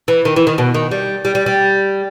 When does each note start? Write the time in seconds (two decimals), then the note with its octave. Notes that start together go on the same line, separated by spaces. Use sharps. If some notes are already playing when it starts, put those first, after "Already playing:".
0.08 E3
0.25 D#3
0.36 E3
0.47 D#3
0.58 B2
0.74 D#3
0.91 G3
1.25 G3
1.35 G3
1.46 G3